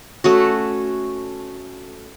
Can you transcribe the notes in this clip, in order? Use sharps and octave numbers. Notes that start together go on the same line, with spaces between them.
A3 C#4 F#4